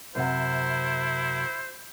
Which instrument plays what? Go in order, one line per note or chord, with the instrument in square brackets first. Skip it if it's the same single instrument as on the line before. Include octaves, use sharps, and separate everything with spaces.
[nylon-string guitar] F#2 C3 F#5 [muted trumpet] E4 [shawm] C5